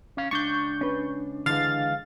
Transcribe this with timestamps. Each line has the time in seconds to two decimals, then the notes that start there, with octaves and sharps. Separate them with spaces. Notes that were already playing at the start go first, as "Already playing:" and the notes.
0.17 C#4 F5
0.31 C#2 D4 C#6 G6
0.81 C#4 B4
1.46 D3 E3 G#3 F5 A6